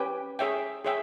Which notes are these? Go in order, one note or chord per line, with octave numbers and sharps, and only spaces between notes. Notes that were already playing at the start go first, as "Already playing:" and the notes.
Already playing: C#4 G4 B4 G5
G#4 C#5 E5 G5
G#4 C#5 E5 G5